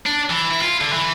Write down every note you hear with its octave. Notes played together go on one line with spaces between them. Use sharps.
D4
E3
E4
F4
D3
E3